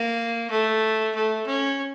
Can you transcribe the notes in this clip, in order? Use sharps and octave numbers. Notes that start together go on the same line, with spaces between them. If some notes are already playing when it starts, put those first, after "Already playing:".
Already playing: A#3
A3
A3
C#4